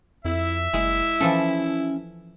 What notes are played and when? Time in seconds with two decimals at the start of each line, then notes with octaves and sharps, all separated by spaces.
0.25 F2 E4 E5
0.74 F#1 G#3 E4
1.21 E3 F3 C#4 A4